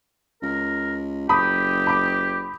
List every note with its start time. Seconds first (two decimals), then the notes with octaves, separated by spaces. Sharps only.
0.42 C#2 A#4
1.29 F#1 G4 B5 D#6
1.87 B5 D6